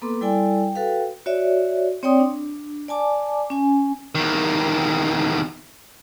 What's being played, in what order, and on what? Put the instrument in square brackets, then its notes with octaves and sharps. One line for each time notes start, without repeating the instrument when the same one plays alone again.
[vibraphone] A#3 B3 A4 B4 C6 D6
G3 E4 A4 D5 G5 G#5
G5
F#4 A4 B4 F5 G5
F#4 C#5 D5 E5
C4 C#5 D5 G5 C6 D#6
D4
D5 G#5 A5 D6
C#4 G#5
[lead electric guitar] E2 D#3